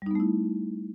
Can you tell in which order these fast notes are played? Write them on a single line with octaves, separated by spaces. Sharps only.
G3 D#4 B3 A3 E4